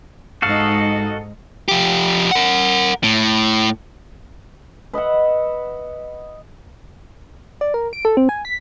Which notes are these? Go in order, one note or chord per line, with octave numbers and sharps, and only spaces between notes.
G#2 D#4 F#4 A4 D#5 F5
F3 G4
A#4 F#5
A2
B4 D#5 E5 F#5
D5
A#4
D7
A4
C4
G#5
B6